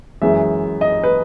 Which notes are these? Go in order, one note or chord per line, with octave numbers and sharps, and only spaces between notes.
F#2 E3 G#3 E5
D#5
B4